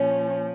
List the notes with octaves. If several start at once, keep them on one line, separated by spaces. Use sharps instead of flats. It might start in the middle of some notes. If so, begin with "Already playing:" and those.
Already playing: A#2 F3 C#4